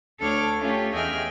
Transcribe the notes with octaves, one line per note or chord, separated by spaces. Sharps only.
D2 D4 A4 C#5 D6 F6
A3 C#4 F4 G4
E2 G#4 D#5 E5 G5 F6